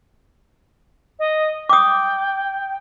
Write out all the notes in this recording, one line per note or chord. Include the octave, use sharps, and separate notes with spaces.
D#5
G5 D6 D#6